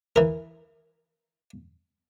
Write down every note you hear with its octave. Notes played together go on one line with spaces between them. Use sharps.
E3 A#4